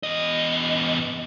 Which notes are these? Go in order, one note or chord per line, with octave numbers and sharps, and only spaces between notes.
E2 D#5